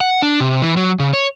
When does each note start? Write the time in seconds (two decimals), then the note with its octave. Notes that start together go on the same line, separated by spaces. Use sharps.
0.01 F#5
0.22 D4
0.40 C3
0.62 E3
0.77 F#3
0.99 C#3
1.13 C#5